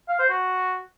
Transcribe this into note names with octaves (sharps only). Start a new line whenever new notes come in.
F5
C5
F#4